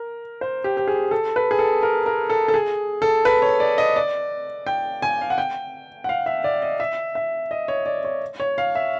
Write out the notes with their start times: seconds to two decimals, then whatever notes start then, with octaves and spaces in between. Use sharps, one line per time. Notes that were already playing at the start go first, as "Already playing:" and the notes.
Already playing: A#4
0.41 C5
0.64 G4
0.77 G4
0.87 G#4
1.11 A4
1.36 B4
1.51 G#4
1.59 A4
1.83 A#4
2.06 A#4
2.30 A4
2.48 A4
2.54 G#4
3.02 A4
3.25 B4
3.42 C#5
3.60 D5
3.78 D#5
3.96 D5
4.67 G5
5.02 G#5
5.21 F5
5.30 F#5
5.38 G5
6.04 F#5
6.09 F5
6.26 E5
6.44 D5
6.62 D#5
6.80 E5
7.15 E5
7.51 D#5
7.68 C#5
7.86 D5
8.04 C#5
8.40 C#5
8.58 F5
8.75 E5